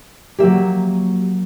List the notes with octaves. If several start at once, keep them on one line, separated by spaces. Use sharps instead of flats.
F#3 A#3 G4 E5